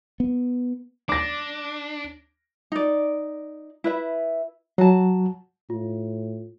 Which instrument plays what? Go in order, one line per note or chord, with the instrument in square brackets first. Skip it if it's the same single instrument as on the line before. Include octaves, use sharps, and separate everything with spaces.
[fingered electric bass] B3
[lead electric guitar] D4 [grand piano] D6 A#6
[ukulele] D#4 D5
E4 B4 E5
[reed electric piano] F#3 [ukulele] F#4 A5
[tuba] A2 [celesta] F4